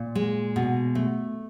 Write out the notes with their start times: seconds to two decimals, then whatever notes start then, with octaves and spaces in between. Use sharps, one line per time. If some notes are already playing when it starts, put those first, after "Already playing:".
Already playing: A#2
0.15 G#3
0.56 B2
0.95 A3